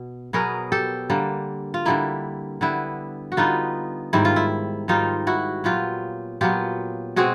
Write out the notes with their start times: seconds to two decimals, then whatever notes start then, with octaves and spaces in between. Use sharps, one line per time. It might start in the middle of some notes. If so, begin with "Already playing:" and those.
Already playing: B2
0.33 B2 F#3 B3 G#4 A#4
0.72 G4 A4
1.10 D3 G3 A#3
1.74 F4
1.85 D3 G3 A#3 E4
2.61 D3 G3 B3 E4
3.32 F#4
3.37 D3 G3 B3 D#4 F4
4.13 G#2 D#3 G3 E4
4.25 F4
4.36 E4
4.88 G#2 D#3 G3 D#4 F4
5.27 E4 F#4
5.64 A#2 F#3 B3 F4 G4
6.41 A#2 F#3 B3 F4 G4
7.16 B2 G#3 C4 F#4 G#4